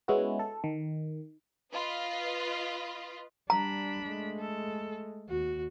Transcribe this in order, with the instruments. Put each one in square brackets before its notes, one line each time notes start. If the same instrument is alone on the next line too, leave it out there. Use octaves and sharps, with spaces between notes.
[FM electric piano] G#3 B3 C#4 E4 F#4
A4
D#3
[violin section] F4 B4 D#5
[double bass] G3 [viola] D4 B5 [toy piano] A#5
[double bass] G#3 A3
[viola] A4
[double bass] D#2 [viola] F#4